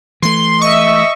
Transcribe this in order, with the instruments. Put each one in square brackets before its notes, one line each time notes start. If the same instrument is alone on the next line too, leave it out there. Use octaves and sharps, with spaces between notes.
[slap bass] E3 A3 [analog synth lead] C6
[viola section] D#5 E5 [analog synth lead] C#6